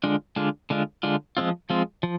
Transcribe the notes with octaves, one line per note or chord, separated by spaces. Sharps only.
D3 G#3 D4 F4
D3 G#3 D4 F4
D3 G#3 D4 F4
D3 G#3 D4 F4
F3 G#3 C4 F4
F3 G#3 C4 F4
F3